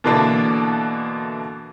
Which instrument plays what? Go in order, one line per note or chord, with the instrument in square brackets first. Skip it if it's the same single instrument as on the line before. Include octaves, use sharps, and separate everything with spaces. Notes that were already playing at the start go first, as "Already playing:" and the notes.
[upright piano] B2 D3 E3 A#3 D4 A4